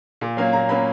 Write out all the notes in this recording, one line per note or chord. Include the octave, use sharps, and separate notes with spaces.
A#2
F#3 A#3 C#4 F5
A#2 A#5
F#3 A#3 C#4 B5